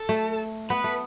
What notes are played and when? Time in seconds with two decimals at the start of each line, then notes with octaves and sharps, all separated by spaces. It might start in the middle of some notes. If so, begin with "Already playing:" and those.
Already playing: A4
0.09 A3
0.70 B3 B4
0.84 A3